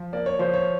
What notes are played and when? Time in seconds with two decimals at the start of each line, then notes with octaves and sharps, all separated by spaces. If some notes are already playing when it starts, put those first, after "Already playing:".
Already playing: F3
0.13 A#3 D5
0.26 C#5
0.39 F3 C5
0.54 C#5